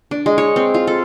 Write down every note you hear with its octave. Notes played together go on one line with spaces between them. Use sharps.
D4
G#3
C#5
C4
F4
A4